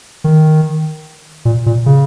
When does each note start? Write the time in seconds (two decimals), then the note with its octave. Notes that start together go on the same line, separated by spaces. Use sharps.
0.24 D#3
1.45 A#2
1.66 A#2
1.86 C#3